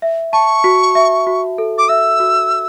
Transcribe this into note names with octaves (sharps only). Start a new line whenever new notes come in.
E5
A5 C#6
F#4
E5
F#4
A4
D6
E5 E6
F#4